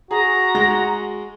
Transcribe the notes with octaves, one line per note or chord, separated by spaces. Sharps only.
F#4 G#4 A#5
G#3 A#6